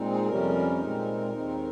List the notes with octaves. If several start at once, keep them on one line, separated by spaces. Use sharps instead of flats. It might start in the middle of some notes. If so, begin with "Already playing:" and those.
Already playing: A#2 G#3 C4 D#4
G#4
F2 C3 G3 C#4 A#4
A#2 G#3 C4 D#4
D#2 D#3 G#3 C4 D#4